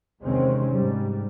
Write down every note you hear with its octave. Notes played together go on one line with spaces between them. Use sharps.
E2 C3 D#3 G#3 C4 C#4
G#2 G3